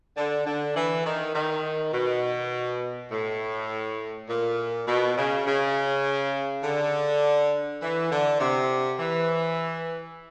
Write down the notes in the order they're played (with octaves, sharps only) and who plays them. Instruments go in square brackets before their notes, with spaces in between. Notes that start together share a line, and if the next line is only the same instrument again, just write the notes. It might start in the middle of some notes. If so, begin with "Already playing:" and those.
[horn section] D3
D3
E3
D#3
D#3
B2
A2
A#2
B2
C#3
C#3
D3
E3
D3
C3
E3